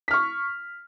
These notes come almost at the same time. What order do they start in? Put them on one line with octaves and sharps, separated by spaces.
B6 F6 C#6